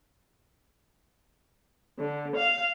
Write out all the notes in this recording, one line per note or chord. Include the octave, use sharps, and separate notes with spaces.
D3
F5